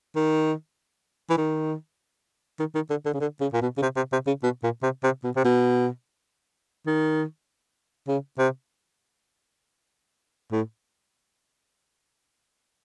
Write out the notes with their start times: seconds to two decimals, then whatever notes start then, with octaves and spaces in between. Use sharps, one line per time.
0.16 D#3
1.30 E3
1.37 D#3
2.59 D#3
2.75 D#3
2.90 D3
3.05 D3
3.14 C#3
3.20 D3
3.41 C#3
3.53 A#2
3.62 B2
3.77 C#3
3.82 C3
3.96 C3
4.13 C3
4.27 C#3
4.43 B2
4.63 A#2
4.83 C3
5.03 C3
5.24 B2
5.36 C3
5.45 B2
6.86 D#3
8.08 C#3
8.39 C3
10.52 A2